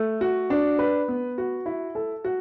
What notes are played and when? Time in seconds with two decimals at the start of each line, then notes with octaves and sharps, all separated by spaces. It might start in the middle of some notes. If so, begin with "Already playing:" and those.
Already playing: A3
0.21 F#4
0.50 D4
0.79 B4
1.08 B3
1.38 F#4
1.66 E4
1.95 A4
2.24 F#4